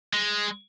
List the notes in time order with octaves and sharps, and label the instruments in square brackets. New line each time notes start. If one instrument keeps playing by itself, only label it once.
[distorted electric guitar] G#3